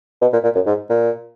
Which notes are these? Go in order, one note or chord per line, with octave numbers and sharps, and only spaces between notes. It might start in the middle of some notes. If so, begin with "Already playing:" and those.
B2
A#2
A#2
F#2
G#2
A#2